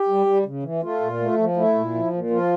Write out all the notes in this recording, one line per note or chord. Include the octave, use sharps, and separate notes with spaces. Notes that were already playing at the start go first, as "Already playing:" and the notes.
Already playing: G4
G3
G3
C#3
E3
A3 F4
A#2
A3
F3
A3 E4
A#2
F3
A#2
F3 F4